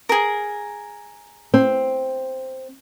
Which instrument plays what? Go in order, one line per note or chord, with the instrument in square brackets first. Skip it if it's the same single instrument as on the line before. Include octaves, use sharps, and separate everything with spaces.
[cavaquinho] G#4 A#4
[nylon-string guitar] C4